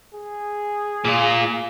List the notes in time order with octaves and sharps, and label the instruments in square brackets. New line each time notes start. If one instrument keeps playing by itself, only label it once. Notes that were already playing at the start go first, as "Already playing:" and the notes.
[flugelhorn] G#4
[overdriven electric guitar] A#2 F4